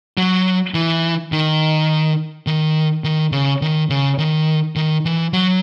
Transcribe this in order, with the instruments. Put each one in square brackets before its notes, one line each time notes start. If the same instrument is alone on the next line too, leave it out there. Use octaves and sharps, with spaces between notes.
[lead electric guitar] F#3
E3
D#3
D#3
D#3
C#3
D#3
C#3
D#3
D#3
E3
F#3